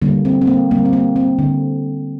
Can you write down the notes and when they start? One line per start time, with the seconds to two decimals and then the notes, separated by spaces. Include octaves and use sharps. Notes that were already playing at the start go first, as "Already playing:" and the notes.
0.02 D3 G3 A#3
0.25 C4
0.41 C4
0.47 A#3
0.71 D3 G3 A#3
0.85 C4
0.93 A#3
1.16 C4
1.39 D3